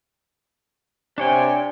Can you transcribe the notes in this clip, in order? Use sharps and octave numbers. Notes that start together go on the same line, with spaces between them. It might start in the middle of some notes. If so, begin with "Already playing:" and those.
C3 D4 C#5 G5 G#5